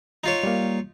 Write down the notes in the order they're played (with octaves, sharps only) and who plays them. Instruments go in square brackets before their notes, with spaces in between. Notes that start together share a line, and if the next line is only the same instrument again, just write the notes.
[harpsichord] D#4 F4 C#5
[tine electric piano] G3 A#3